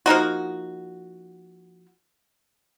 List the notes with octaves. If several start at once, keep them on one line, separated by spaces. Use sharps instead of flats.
F3 A#3 D#4 F#4